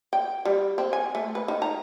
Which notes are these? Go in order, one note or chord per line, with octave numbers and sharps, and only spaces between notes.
G5
G3
C4
G#5
A3
B4
D#3
A#5